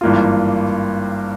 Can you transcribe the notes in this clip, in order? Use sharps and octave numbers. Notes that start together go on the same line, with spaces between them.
G#1 G2 E3 A#3 F4